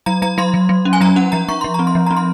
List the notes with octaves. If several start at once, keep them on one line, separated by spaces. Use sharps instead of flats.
F#3 A#5
F#3 A#5
F#3 C6
F#3
F#3
C#4
G#5
F#3 A#5
C#4 F#5
F3 A#5
F3 C#6
F3 C6
C4 A#5
C6
F3
C4 A#5
C6